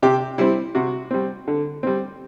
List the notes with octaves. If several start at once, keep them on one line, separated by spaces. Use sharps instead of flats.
C3 G4
G3 C4 E4
C3 F#4
G3 C4
D3
G3 C4